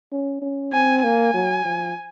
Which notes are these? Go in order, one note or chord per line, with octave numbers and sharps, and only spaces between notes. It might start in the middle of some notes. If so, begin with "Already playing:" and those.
C#4
C#4
C4 G#5
A#3 G#5
F#3
F3